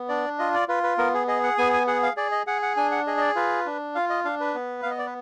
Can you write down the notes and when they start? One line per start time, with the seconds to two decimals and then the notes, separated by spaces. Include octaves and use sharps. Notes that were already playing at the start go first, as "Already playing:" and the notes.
Already playing: B3
0.09 D4 D5
0.39 F4 D#5
0.54 D5
0.68 F4 B4
0.83 B4
0.98 B3 A#4
1.14 G#4
1.27 G#4 D#5
1.43 F#5
1.58 B3 G#5
1.73 G#5
1.87 G#4 F#5
2.03 F5
2.17 G#4 D5
2.32 D#5
2.47 G#4 F#5
2.62 F#5
2.76 D4 G#5
2.91 F#5
3.07 G#4 D#5
3.17 D#5
3.21 D5
3.36 F4 B4
3.66 D4
3.95 F4 F5
4.10 D#5
4.25 D4 F5
4.40 B4
4.55 B3
4.82 B3 F5
4.90 D#5
4.98 D5
5.06 B4